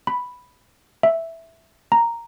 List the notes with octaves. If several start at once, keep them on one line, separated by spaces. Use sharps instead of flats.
B5
E5
A#5